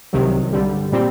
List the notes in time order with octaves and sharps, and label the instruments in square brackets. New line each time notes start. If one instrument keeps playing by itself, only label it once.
[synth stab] C2 C3 D#3 F#3
G2 D3 G3
A#2 G3 C4